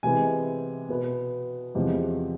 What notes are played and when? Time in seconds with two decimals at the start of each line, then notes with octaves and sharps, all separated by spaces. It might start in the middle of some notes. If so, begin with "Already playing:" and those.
0.03 C3 E3 G#3 B3 G#5
0.89 B2 B3
1.75 E2 C3 F3 G#3